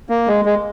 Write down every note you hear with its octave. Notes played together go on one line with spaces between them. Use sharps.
A#3
G#3
G#3